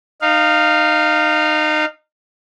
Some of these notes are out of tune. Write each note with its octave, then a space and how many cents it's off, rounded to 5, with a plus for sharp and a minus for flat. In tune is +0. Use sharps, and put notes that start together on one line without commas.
D#4 -25 F5 +0